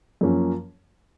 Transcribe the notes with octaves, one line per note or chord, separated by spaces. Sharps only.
F#2 F3 A#3 C#4